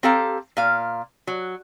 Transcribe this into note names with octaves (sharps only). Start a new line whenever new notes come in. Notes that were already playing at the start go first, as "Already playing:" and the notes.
C4 G4 A4 F5 A#5
A#2 F5
F#3